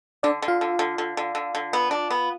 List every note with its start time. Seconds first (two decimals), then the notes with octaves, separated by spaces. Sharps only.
0.23 D3 D4 D5
0.42 D3
0.48 F4 F5
0.61 D3
0.79 D3
0.98 D3
1.17 D3
1.35 D3
1.55 D3
1.73 B3
1.91 D4
2.11 B3